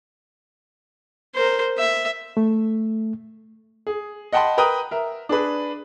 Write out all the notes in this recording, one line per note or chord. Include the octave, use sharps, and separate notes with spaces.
A#4 C5
E5
A3
G#4
D#5 F#5 G5 A5 B5 C6
A#4 B4 G5 A#5 D#6
A#4 E5
D4 G#4 B4